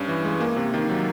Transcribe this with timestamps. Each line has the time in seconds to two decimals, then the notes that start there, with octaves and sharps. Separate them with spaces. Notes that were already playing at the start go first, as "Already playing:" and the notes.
Already playing: G2 C#4
0.08 E3
0.25 G#3
0.41 A#3
0.56 C3
0.74 D#3
0.90 F#3